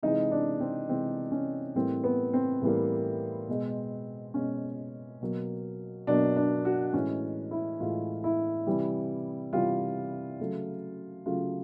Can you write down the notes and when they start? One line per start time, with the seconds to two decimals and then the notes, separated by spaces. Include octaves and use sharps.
0.03 C3 E3 G#3 D#4
0.31 D4
0.60 C4
0.89 C3 E3 G#3 C4
1.32 C#4
1.76 A2 E3 G3 A#3 C4
2.04 B3
2.33 C4
2.62 A2 E3 G3 A#3
3.48 B2 G#3
4.34 B2 G#3 C#4
5.21 B2 F#3 A#3
6.07 B2 F#3 A#3 D4
6.36 D4
6.65 F#4
6.93 A2 E3 G#3 C#4
7.51 E4
7.80 A2 E3 G#3 F4
8.24 E4
8.67 C3 E3 G3
9.53 C3 E3 G3 F4
10.40 C#3 F#3 A3
11.26 C#3 F#3 A3 F4